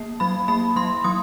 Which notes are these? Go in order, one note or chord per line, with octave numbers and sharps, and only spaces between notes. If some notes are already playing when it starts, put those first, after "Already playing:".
Already playing: A#3
F#3 B5
A#3 B5
F#3 C6
F#3 D#6